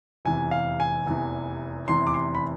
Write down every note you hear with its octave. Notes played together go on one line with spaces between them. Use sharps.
F1 E2 C3 E3 G#5
F5
G#5
F1 E2 C3 E3
F1 E2 C3 E3 C6
D6
C6
B5